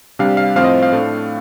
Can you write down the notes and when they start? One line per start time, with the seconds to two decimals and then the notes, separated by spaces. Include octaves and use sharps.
0.19 C3 G3 D4 F5
0.37 F5
0.56 A2 F3 C4 F5
0.64 D#5
0.83 F5
0.91 A2 A3 D4